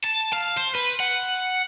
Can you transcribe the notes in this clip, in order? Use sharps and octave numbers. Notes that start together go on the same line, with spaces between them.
A5
F5
C5
B4
F#5